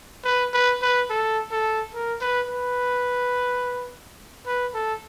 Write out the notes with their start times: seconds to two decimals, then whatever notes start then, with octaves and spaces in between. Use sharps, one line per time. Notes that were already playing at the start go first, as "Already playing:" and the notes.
0.25 B4
0.54 B4
0.82 B4
1.10 A4
1.52 A4
1.94 A#4
2.21 B4
2.49 B4
4.46 B4
4.74 A4